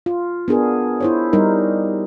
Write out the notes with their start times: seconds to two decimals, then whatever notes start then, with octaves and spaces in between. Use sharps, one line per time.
0.06 F4
0.48 B3 D4 G#4 A#4
1.00 E4 C5 C#5
1.33 G3 D#4 A#4